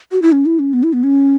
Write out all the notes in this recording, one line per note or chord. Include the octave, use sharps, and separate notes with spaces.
F#4
E4
C#4
E4
C#4
B3
E4
B3
C#4